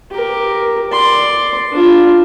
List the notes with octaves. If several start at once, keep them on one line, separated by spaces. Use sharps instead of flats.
G4 A#4
D5 C6
D4 F4